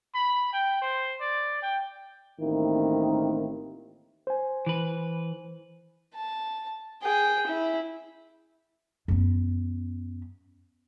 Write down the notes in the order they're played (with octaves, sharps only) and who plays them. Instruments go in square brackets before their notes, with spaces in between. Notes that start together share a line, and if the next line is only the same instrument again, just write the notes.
[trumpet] B5
G5
C5
D5
G5
[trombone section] A1 D#3 A#3 C4 E4
[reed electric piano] C5 G#5
[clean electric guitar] E3 B4
[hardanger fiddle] A5
G#4 G5
E4
[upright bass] F#2 B3